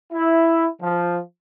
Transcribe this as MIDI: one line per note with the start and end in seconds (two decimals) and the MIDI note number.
0.13 0.67 64
0.81 1.19 53